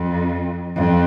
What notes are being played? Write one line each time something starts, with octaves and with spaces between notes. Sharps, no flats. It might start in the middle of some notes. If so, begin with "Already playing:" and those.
Already playing: F2
F2